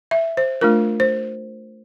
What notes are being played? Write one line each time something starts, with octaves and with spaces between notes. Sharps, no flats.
E5
C5
A3 D4 F4 A#4
C5